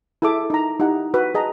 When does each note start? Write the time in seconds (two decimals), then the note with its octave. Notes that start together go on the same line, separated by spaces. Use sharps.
0.22 E4 G#4 A4 E5 D6
0.50 D#4 A#5
0.80 D#4 E4 G4 F#5
1.14 F#4 B4
1.34 G#4 D#5 A5 A#5